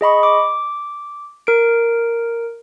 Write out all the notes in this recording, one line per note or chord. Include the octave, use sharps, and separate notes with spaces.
G#4 D#5 B5 C#6
D6
A#4 D7